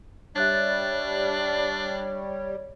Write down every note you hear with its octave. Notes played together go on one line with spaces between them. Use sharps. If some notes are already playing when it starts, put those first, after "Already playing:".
G3 D4 C#5 E5 F#6 A6